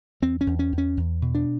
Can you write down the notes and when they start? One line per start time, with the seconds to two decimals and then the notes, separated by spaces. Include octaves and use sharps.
0.22 E2 C4
0.41 C#4
0.47 E2
0.59 C#4
0.72 E2
0.78 C#4
0.97 E2
1.22 B2
1.35 D4